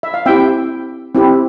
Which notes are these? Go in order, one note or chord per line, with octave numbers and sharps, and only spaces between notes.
E5
F5
C4 E4 G4 E5 G5
C4 E4 G4